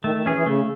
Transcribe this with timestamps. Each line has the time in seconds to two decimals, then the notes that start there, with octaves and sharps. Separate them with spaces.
0.04 D#3 A3
0.15 D#3
0.25 E3 C#4 G#4
0.36 E3
0.46 C#3 A3